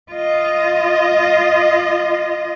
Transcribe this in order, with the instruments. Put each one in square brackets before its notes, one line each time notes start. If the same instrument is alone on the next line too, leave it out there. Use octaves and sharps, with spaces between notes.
[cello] F4 D#5